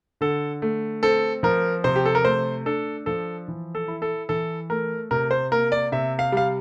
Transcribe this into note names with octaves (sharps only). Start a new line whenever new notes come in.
D3 A4
A3
C4 A4
F3 A#4
C3 C5
G4
A4
A#4
A3 C5
D4 A4
F3 A4
E3
A4
E4
A4
E3 A4
A3 A#4
C3 A#4
C5
A#3 A#4
D5
C3 E5
F5
G3 F5